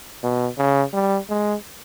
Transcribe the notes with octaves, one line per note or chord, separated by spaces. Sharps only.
B2
C#3
G3
G#3